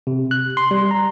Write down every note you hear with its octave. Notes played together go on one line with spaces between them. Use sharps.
C3
F#6
C6
G3
A#5